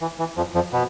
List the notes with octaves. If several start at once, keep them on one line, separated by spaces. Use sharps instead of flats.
E3
E3
F2 F3
F2 F3
B2 B3